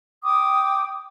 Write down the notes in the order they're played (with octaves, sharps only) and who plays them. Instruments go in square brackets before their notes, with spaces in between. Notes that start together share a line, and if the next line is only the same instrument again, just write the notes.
[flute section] G5 D6 D#6